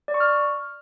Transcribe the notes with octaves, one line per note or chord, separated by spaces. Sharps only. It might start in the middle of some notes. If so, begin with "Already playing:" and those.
D5
C#6
F6